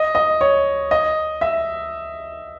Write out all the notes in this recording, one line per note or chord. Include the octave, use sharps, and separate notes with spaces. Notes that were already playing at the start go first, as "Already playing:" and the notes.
Already playing: D#5
D#5
C#5
D#5
E5